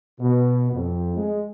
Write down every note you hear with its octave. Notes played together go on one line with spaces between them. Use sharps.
B2
F2
G#3